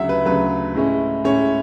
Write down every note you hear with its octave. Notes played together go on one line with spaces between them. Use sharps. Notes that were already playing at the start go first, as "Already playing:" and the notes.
Already playing: D2 C#3 F#3 E5 F#5
B4
D2 C#3 F#3 B4
A2 G#3 C#4 E4
A2 G#3 C#4 E4 C#5